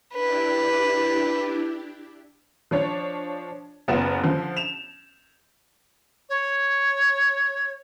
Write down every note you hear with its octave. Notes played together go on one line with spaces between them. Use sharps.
D4 E4 G4 B4
F3 D4 C#5
F#1 B3 F4 E7
D3 F3
E7 F7
C#5